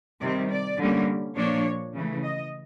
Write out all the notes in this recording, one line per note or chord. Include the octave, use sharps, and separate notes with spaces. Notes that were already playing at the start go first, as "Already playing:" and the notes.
C3 D#3 G3 C4 D5
D5
D3 G3 A#3 C#4
A#2 F3 A#3 D4 C#5
C#3 E3 A3
D#5